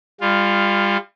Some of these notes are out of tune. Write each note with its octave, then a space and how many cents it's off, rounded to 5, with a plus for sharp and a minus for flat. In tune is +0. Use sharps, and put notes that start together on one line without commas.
G3 +35 F4 +0